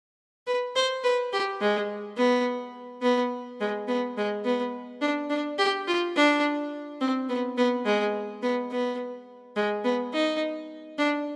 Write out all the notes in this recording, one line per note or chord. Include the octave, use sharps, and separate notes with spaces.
B4
C5
B4
G4
G#3
B3
B3
G#3
B3
G#3
B3
D4
D4
G4
F4
D4
C4
B3
B3
G#3
B3
B3
G#3
B3
D#4
D4